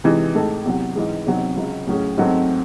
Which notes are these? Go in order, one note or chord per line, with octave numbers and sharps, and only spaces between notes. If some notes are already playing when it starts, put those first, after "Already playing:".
C3 E3 G#3 D#4 G#4
A2 G#3 D#4 A4
E2 C3 F#3
G#2 E3 G#3
E2 C3 F#3 C4 D#4
C#2 C#3 F#3
A2 F#3 C#4 G#4
G#2 F#3 A3 C4